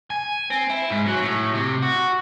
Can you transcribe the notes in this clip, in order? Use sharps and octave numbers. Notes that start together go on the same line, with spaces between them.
G#5
C4
E4
G#2
F#3
A2
C3
F#4